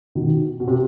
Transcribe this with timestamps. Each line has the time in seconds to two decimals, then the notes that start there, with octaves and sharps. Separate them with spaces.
0.15 B2 D#3
0.60 B2
0.68 C3